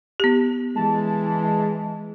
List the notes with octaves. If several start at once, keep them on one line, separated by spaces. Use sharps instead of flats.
B3 G4
E3 G#3 A5